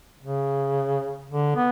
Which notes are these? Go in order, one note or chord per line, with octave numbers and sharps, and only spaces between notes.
C#3
D3
B3